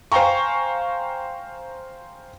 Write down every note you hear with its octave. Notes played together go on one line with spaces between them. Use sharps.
C5 F5 G5 G#5 A#5 C#6